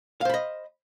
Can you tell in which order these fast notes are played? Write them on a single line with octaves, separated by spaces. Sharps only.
F5 C5 B5 D#5